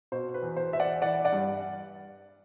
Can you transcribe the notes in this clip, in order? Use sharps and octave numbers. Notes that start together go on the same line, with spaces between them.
B2 C5
B4
E2
C5
E2 E5
D5 F#5
E3 D5 F#5
D5 F#5
G2